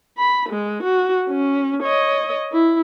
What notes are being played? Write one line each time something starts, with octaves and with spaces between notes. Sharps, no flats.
B5
G#3
F#4
C#4
C#5 D#5
E4